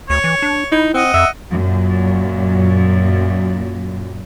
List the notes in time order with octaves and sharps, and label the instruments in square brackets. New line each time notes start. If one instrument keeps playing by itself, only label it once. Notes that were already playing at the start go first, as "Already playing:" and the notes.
[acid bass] D2 [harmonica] C#5
[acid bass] E3
D4
[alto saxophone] D#4 [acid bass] E4
[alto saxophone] C4 [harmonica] D#5 F#5
[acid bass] F2 [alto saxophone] E5
[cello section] F#2 A#2